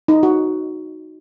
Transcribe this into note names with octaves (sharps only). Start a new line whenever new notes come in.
D#4
F#4